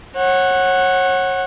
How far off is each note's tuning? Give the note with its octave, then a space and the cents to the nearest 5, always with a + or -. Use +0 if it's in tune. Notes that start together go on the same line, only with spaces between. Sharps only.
C#5 -30 F#5 +0